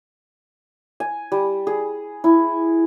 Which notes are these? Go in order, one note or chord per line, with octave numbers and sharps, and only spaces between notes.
G#5
G3
G#4
E4